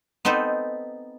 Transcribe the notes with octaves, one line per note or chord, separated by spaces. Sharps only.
B3 C4 D#4 A4 C5